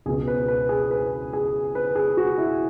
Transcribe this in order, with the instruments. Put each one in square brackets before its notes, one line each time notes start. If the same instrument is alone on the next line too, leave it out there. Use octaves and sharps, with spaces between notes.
[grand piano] C#2 B2 G#4
B4
B4
G#4
B4
G#4
B4
G#4
F#4
E4